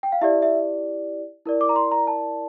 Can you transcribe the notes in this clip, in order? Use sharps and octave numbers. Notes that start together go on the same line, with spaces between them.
G5
F5
E4 G4 D5 E5
E5
E4 A#4 D5
D6
A#5
C6
A#5
A5